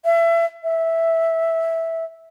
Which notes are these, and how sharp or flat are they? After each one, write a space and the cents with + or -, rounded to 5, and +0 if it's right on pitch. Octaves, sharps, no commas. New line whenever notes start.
E5 +30
E5 -5